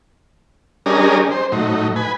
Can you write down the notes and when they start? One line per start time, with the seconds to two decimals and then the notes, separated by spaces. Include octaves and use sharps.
0.86 G3 C#4 D4 G#4 A#4 D#5
1.31 C5
1.52 A2 F#3 D#4
1.96 B4 G#5